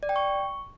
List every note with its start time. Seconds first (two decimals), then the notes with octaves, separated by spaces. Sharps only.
0.03 D5
0.09 G5
0.16 C#6